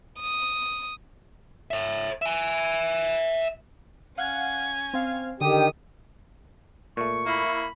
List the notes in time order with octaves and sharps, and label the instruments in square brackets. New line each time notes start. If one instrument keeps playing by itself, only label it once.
[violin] D#6
[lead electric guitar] C#5 E5
E5 G#5
[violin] C#4 G#6 [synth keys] F5 F#5
[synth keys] C4 F5
[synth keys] D3 [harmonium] D#3 [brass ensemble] G4 [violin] D#6
[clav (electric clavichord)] A#2 A3 [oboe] C#6
[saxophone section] A#3 E4 [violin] B5